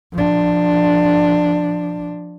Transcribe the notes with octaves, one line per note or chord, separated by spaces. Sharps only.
F3 D4